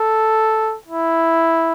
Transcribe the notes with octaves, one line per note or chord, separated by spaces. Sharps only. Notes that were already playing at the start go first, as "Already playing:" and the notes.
Already playing: A4
E4